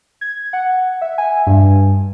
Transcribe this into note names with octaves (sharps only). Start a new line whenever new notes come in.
G#6
F#5
E5
G#5
G2